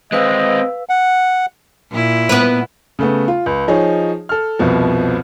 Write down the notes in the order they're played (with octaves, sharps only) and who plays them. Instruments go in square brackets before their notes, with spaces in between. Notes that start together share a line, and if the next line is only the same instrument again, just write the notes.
[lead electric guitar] G#3 C4 [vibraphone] B4 F5 E6 [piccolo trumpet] D#5
[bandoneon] F#5
[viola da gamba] A#2 E4
[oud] B3 B4
[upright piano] C#3 A3 B3
F4
C#2
F3 D#4 G#4 C#5
A4 F6
C2 F2 B2 F3